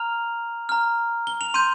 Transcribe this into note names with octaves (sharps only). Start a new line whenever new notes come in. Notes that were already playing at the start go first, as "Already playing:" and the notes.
Already playing: A#5 F6 F7
A#5 F6
G7
F7
C6 G6 D#7